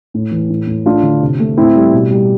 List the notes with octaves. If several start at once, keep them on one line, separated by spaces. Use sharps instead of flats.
A2
E3
A2
A2
A3 D4 F4
D3
C3
A3
A2 C4 E4
G3
B2
G3